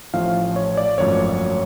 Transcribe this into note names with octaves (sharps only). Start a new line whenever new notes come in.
A1 A2 F3 A3 F5
C#5
D5
G#1 F#2 F3 A3 C#5